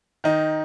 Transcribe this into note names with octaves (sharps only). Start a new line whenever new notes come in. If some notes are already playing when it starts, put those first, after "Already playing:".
D#3 D#4